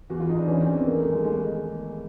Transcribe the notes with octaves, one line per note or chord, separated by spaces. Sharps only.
E2 F#4
F4
E2 D#4
D4
E3 C#4
C4
E2
B3
D#3 A#3
A3
D#2
G#3
D#2 G#3
G#3